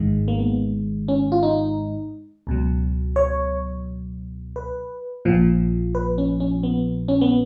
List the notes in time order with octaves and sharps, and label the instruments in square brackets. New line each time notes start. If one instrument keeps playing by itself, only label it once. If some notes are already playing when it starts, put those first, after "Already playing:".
Already playing: [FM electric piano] G#1 G#2 D#3 G#3
A#3
B3
C#4
F4
D#4
C#2 B2 F#3
C#5
B4
A#1 A#2 F3
B4
C#4
C#4
B3
C#4
B3